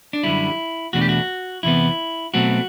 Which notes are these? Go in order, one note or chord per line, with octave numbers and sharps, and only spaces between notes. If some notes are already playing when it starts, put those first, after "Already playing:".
D4
F#2 D3 G3 E4
E2 B2 A3 D4 F#4
G4
F#4
E2 C3 E3 B3 E4
B2 F#3 A3 C4 F#4